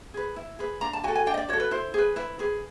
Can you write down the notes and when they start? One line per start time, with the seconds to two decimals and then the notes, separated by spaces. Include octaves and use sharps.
0.14 G#4 B4
0.36 E4
0.59 G#4 B4
0.81 D4 A#5
0.93 A5
1.04 F#4 G#5
1.08 A4
1.15 G#5
1.26 D4 G5
1.34 D#5
1.37 D5
1.49 F#4 A4 C#5
1.60 B4
1.71 E4 C5
1.94 G#4 B4
2.16 E4 B4
2.39 G#4 B4